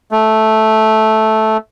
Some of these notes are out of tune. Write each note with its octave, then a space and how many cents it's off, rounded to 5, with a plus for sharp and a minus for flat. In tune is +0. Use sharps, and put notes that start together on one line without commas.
A3 -10